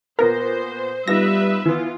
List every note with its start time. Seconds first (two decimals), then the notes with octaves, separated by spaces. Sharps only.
0.19 A#2 B3 A#4 C5 A#6
1.08 G3 B3 D#4 F4 B4 E5 A#6
1.66 E3 B3 F4